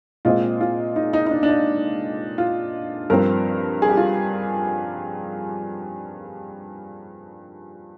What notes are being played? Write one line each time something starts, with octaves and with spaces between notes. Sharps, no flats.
A#2 G#3 C4 F4
F4
D#4
D#4
D#4
D4
D4
D#4
F4
G2 F3 C4 A#4
G#4
G4
F4